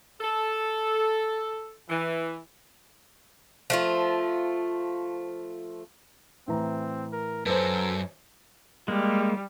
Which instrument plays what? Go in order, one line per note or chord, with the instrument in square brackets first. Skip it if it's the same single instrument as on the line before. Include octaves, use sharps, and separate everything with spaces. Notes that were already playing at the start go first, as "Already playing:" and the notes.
[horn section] A4
E3
[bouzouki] F3 A3 F4
[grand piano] A2 E3 A#5 [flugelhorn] C4
[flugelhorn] A#4
[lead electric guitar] F#2 [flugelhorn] A4 [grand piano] B4 C5
[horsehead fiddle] G3 [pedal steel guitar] G#3 A#3